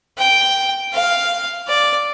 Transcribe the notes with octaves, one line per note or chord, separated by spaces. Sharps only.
G5
F5
D5